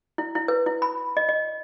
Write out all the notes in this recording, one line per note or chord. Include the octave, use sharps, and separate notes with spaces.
E4
E4
B4
E4
B5
D#5
D#5